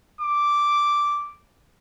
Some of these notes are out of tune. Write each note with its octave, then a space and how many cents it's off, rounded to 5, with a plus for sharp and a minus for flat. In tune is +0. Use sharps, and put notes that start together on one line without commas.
D6 -5